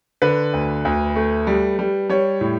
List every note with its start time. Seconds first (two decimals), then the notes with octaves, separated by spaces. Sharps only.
0.22 D3 B4
0.53 D2
0.85 D2
1.16 A3
1.47 G3
1.79 G3
2.09 G3 C#5
2.41 A2